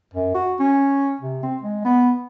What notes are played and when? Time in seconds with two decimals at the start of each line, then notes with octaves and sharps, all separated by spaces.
0.14 F#2
0.35 F#4
0.60 C#4
1.21 C3
1.43 C4
1.63 G#3
1.85 B3